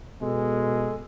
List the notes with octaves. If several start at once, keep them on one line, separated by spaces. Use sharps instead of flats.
B2 G#3 A4